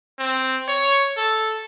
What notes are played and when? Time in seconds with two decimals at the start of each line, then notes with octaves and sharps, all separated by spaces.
0.19 C4
0.68 C#5
1.17 A4